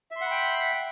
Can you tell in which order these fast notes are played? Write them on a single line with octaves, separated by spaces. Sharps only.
E5 C6 F#5 B5 G5